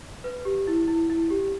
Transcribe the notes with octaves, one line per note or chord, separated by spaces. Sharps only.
B4
G4
E4
E4
E4
G4